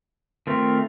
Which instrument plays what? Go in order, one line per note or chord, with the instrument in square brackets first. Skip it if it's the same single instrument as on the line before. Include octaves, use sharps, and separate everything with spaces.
[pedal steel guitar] D#3 A3 C4 F4